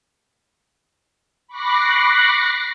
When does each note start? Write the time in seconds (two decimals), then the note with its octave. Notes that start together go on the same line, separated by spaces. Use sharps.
1.47 B5 C#6 D6 F#6 A#6 C7